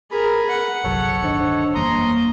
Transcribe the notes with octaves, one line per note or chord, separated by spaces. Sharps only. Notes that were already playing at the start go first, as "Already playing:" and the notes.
G#4 A#4 B5
F#5
G1 C2 F#3 A4 C#5
D1 G1 D#3 D4 C5 D#5
F#1 E2 G3 A#3 A#5 C6 D#6